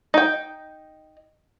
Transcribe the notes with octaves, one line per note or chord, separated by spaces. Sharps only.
D#4 G5